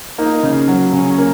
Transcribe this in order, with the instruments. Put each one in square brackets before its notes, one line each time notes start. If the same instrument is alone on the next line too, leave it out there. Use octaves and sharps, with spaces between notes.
[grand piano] A#3 [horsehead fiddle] D#4
[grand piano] C#3
F#3
[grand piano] C#3 [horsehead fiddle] C#4
[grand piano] A#3